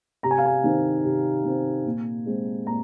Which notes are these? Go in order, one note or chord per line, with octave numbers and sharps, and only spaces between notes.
C3 A#5
G#5
F5
G#5
D#3 C4
C3
D#3 C4
A#2
G#3 C4
A#2 A#5